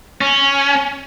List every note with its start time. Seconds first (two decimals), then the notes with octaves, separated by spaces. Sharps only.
0.21 C#4